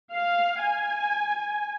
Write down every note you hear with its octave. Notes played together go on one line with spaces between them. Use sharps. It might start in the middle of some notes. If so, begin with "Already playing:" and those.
F5
G#5